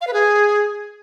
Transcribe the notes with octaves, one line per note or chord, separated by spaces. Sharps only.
F5
B4
G#4